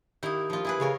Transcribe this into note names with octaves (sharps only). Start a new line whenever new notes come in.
D#3 A#3 E4 G4 D#6
F3 F4
E4 G#4 B4
C#3 A#4 C#5 F5